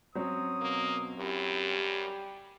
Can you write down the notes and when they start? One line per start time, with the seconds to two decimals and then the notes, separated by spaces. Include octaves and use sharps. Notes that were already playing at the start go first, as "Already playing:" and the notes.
0.15 F#3 C4 C#4 D#6
0.61 B2 A#3
1.19 F#2 E4 G4
1.72 G3